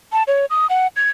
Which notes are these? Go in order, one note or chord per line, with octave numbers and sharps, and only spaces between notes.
A5
C#5
D#6
F#5
G#6